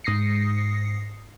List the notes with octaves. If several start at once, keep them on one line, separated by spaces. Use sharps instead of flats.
G#2 D#6 A#6 C7 C#7